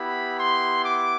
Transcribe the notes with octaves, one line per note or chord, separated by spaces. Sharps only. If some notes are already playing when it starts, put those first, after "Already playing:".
Already playing: B3 E4 G4 B5
C6
D6